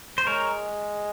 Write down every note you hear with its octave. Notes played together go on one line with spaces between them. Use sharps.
C5
G#3 A#4 C#5